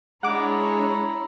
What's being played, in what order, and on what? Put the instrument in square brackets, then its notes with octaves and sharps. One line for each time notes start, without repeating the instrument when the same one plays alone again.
[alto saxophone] G#3 [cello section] D4 G#4 C#5 [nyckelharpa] E4 A#5 [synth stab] F#5 D6